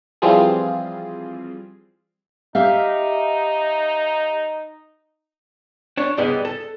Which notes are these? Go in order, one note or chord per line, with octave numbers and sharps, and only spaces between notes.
E3 F3 G3 C4 F4 G#4
D#4 G4 E5 F5
D4 C#5
C#2 G#2 G3 G#3 B3
A4